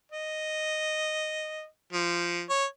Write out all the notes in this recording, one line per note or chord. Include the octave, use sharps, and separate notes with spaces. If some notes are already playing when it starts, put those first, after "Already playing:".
D#5
F3
C#5